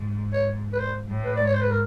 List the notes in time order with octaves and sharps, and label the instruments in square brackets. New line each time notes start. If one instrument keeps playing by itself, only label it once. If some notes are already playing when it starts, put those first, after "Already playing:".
Already playing: [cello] G#2
[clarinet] C#5
B4
C5
[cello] A2
[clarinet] B4
D5
[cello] G#2
[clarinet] C#5
C5
B4
A#4